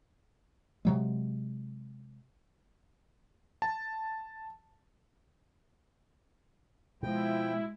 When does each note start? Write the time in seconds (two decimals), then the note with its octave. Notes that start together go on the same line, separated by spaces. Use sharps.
0.85 C3 F#3 G#3
3.62 A5
7.03 B2 F3 G#3 E4 G5